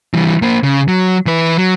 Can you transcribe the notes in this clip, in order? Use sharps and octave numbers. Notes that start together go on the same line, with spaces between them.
E3 G3
A#3 C5
C#3
F#3
E3 B4
F#3